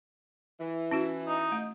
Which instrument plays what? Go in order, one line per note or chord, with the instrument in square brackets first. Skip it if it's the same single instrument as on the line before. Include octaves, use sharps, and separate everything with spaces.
[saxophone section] E3
[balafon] C#4 E4 F#4
[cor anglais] D#4
[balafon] A3